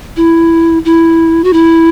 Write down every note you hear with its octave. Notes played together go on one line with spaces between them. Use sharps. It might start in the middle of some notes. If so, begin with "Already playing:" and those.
E4
E4
F#4
E4